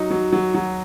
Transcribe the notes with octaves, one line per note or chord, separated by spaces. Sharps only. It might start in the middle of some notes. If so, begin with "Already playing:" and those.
Already playing: F#3 D#4
F#3
F#3
F#3